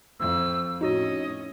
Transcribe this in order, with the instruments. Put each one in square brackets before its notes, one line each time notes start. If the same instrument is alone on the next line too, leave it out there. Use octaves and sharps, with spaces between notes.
[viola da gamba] F2 [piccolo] E6
[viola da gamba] A2 C#4 [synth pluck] D#4 F#4 C#5 [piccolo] D#5